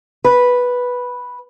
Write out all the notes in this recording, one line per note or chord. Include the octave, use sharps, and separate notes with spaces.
B4